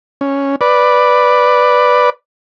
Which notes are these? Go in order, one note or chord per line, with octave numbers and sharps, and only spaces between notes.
C#4
B4 D5